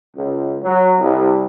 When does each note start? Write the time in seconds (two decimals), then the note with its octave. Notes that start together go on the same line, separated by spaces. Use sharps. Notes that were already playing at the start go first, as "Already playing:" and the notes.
0.15 C#2
0.62 F#3
1.00 C2